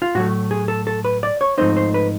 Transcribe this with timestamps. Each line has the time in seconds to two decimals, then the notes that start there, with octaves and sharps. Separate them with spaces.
0.02 F4
0.15 A2 F#3 A3 F#4
0.51 G#4
0.68 A4
0.87 A4
1.05 B4
1.23 D5
1.41 C#5
1.58 G#2 F3 A3 C4 D#4 C5
1.77 C5
1.94 B4